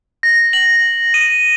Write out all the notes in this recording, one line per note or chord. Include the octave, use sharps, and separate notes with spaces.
A#6
F#7
D#7